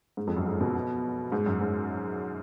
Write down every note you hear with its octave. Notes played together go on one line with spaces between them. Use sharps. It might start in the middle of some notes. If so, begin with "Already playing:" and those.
G#2
F2
F#2
G#2
B2
G#2
F#2
G#2